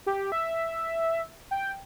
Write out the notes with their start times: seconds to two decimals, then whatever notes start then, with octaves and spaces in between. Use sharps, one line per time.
0.06 G4
0.32 E5
1.51 G5